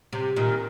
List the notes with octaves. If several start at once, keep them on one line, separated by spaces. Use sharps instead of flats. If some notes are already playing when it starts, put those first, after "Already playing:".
C3
A#2 D#3